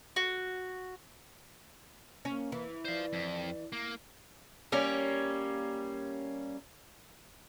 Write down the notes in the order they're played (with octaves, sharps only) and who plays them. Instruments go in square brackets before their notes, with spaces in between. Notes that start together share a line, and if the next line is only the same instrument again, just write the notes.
[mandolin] F#4
[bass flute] A#3 [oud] C#4
[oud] E3
[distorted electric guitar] C5 F5 [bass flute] D5
[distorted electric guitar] F2
A#3
[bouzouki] G3 A#3 C#4